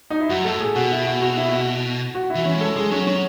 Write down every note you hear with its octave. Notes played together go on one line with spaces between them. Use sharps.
D#4
E4
F#2 F#4
A2 A4
G#4
B2 F#4
E4
F#4
F#4
E4
F#4
F#4
E4
E3
C#4
G#3
A4
G#3 G#4
F#3 C#4
F#3 C#4